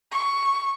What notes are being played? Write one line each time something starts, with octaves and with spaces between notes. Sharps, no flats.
C#6